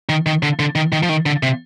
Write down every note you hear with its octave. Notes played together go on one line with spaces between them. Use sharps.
D#3
D#3
D3
D3
D#3
D#3
F3
D#3
D3
C3